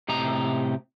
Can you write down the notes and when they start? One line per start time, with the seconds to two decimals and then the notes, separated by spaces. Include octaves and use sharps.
0.08 A2 C3 G4 D#5 A#5